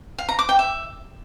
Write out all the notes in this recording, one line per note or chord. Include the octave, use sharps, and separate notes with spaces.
F5
A#5
D6
G5
E5